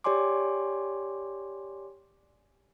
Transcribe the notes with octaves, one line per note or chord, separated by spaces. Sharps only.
G4 C#5 D5 G#5 C6 D6